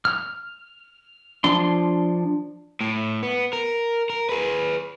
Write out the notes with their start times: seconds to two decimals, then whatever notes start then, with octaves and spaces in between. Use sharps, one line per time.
0.05 F6
1.44 F3 D4 C6
2.81 A2
3.23 B3
3.53 A#4
4.10 A#4
4.29 G#4 B4